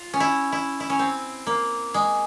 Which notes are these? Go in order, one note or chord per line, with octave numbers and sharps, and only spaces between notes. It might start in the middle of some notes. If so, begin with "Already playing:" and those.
Already playing: F4
C#4
E4
E4
E4
C#4
C4
A#3
G#3